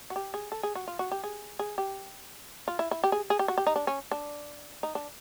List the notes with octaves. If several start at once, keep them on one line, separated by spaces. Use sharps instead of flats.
F#4
G4
G#4
A4
G#4
F#4
F4
F#4
G4
G#4
G#4
G4
F4
E4
E4
G4
G#4
G#4
G4
F#4
G4
D#4
D4
C#4
D4
D#4
D4